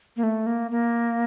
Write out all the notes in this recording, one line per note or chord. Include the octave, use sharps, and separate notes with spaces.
A#3
A3
A#3
A#3